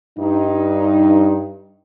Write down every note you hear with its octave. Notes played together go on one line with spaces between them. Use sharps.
G2 D#4